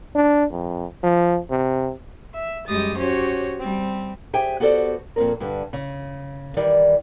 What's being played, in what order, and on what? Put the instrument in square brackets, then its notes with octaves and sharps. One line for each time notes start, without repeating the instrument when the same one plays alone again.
[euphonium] D4
F2
F3
C3
[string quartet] E5
F#2 G3 G#3 G4 D#6 A6
C#4 F#4 G4 C5 C#5
G3 C4
[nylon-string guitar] G4 G#4 C5 E5 G5 G#5
B3 F#4 G4 A4 C5 D5
F2 A#2 C#3 C4 A#4
G2 D3
C#3
D#3 E3 G3 D5